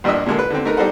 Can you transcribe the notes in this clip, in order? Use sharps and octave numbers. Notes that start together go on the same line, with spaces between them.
A#1 G2 G3 D4 D#5 E6
A#2 D3 G#3 A#3 A4
B4
D3 C4
A3 D#4 A#4 B4
G3 D#4 A4 C5 F#5